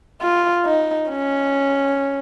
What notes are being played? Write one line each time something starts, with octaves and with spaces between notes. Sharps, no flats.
F4
D#4
C#4